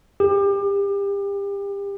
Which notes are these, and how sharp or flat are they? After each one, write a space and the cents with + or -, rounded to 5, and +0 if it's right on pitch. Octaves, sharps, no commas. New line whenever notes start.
G4 +30